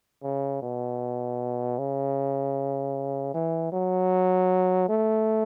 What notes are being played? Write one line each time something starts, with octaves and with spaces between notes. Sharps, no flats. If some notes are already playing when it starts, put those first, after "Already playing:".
C#3
B2
C#3
E3
F#3
A3